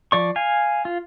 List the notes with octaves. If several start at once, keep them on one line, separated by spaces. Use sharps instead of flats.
F3 D5 C#6
F5 G#5
F4